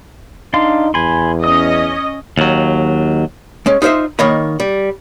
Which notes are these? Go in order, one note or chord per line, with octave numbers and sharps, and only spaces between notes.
D4 D#4 F5 C6
E2 G#5 B5 C6
C#4 D#5 D#6
D#2 F#3
G#3 C#4
D#4 F4 C5 D#5 E5
D#3 A#3 C#5 D#5 B5
G3